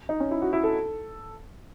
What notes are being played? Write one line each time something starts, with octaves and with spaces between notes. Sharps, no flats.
D#4
C#4
E4
F#4
E4
A4